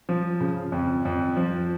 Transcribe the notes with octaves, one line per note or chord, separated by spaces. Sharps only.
F3
C#3
F2
F2
F3